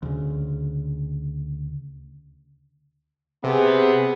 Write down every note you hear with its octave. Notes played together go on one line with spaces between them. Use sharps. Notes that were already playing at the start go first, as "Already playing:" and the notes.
D2 C#3
C3 B3 G#4